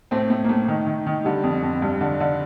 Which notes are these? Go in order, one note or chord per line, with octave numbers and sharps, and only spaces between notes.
A2 A3 C4
A2 A3
A#3
A2 A3
D#3
D#3
D#3
D3 G3
F2
F2
G2
D3
D3